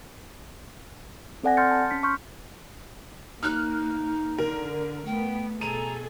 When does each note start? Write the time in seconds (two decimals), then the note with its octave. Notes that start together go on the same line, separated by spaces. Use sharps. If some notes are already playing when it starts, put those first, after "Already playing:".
1.43 C4 A4 D5 F#5 G#5 A#6
1.57 C6 F6 G6 A6 C#7
1.71 A5
1.90 C#4 B6 C#7
2.03 C6 C#6 F6 G6
3.43 A#3 D#4 F6 F#6
4.38 D3 A#4
5.06 A3 B3 G5
5.61 B2 G#4 A4 A#5 D#7